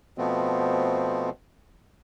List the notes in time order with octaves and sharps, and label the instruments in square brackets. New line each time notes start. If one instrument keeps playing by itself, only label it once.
[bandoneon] B2 F3 A3 B3 C4